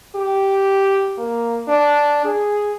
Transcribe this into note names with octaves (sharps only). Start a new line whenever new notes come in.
G4
A#3
D4
G#4